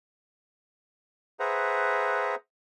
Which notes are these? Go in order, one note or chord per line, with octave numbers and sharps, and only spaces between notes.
G#4 B4 C5 E5 F#5 A#5